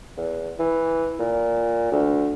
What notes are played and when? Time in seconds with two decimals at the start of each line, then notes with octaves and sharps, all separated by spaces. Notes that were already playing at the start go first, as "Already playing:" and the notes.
0.17 E2
0.59 E3
1.19 A#2
1.92 D2